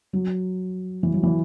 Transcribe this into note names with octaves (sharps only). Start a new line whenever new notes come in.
F#3
E3
F#3
E3